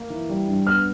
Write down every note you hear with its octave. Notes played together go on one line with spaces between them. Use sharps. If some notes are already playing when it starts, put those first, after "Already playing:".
Already playing: A#3
E3
G3
G2
B3 F6